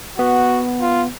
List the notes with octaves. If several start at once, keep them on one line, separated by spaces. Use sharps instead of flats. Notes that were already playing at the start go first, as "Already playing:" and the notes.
B3 F#4
F4